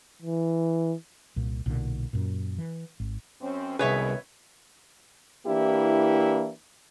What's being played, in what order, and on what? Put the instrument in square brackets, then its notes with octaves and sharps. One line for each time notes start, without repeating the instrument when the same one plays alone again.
[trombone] E3
[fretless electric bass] C2 A#2
B1 A#2 D3
F#2 A#2
E3
G#1
[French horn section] F#2 C4 C#4
[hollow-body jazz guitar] C2 G#4 [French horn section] F#2 B2 D#3 [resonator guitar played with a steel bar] B4 C#5 E5
[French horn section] E3 A#3 D4 E4 G4